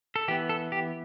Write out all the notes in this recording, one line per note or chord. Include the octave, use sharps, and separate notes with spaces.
A4
E3 B3 G4
A4
G4